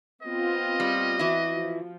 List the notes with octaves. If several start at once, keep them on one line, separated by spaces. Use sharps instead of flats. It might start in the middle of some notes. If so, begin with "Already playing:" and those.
B3 C4 F4 D#5
G3
E3 E4 F#4
F3